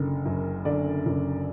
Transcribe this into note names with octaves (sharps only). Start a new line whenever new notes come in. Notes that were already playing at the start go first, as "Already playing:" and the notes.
Already playing: F#1 D3
F#2
D3 D5
F#1